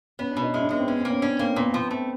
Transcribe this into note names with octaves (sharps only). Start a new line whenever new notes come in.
B3 C#4
D4
B2
D#4
G#3 E4
D4
G#3 B3
C4
B3 C#4
C4
A#3
C#4
C#4 D4
A#3 C4
A#2 B3
C4
F3
B3
A3 C4